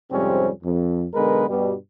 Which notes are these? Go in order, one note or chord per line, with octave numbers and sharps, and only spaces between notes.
F2 G#2 C3 G3 C4 C#4
F2
B1 D3 G#3 B3 A#4 B4
G2 B2 G3